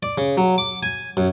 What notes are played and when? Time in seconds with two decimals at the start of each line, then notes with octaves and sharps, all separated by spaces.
0.03 D5
0.18 C#3
0.37 F#3
0.58 D6
0.83 G#5
1.17 F#2